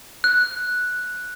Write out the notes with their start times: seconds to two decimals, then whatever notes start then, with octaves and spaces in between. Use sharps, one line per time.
0.24 F#6